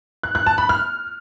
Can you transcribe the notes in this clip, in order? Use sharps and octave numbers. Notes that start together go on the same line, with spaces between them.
F#6
F#6
A5
B5
F6